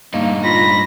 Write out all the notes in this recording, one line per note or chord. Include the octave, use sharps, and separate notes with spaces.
G2 A#3 D#4
F4 B5 A#6